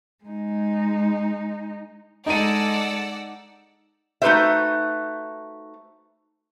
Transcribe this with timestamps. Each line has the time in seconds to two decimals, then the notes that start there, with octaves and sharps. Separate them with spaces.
0.25 G#3 D#4
2.26 G#3 D#4 A4 D5 F#5 E6 D#7
4.22 A3 D#4 F#4 B4 C5 E5